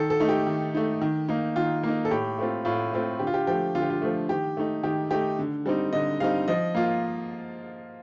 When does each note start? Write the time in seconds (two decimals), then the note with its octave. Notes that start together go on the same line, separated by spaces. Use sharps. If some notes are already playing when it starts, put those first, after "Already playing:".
Already playing: D#3 A4
0.10 A4
0.20 A3 D#4
0.29 G4
0.47 D#3
0.75 A3 D#4
1.01 D#3
1.29 A#3 D#4
1.56 D#3 F4
1.83 A#3 D#4
2.05 A4
2.11 A2 G4
2.39 A3 C4 F4
2.65 A2 F4
2.93 A3 C4 F4
3.20 D3 G4
3.27 F4
3.34 G4
3.47 F3 A3 G4
3.75 D3 F4
3.82 G4
3.90 F4
4.02 F3 A3
4.29 D#3 G4
4.57 A3 D#4
4.83 D#3 G4
5.11 A3 D#4 G4
5.39 D3
5.66 G3 C4 D#4
5.93 D3 D#5
6.20 G3 C4 D#4 F5
6.48 F3 D#5
6.75 A#3 F4